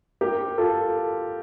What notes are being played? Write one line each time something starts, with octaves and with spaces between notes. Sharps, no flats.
G4 A#4
F4 A4